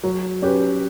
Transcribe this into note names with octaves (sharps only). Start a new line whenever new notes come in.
F#3
C#4 G4 B4